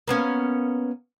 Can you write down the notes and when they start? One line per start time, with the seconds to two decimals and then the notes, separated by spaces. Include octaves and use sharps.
0.08 A#3 B3 C#4